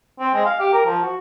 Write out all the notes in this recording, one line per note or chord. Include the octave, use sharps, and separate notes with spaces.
C4
G#3
F5
G4
A#4
F3
F#4